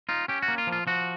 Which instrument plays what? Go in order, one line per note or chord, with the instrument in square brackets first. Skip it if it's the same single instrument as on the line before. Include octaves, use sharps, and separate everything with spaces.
[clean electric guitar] D#4 F4
C#4 G4
F#4
A#3
F4
F3
F4
F3 F#4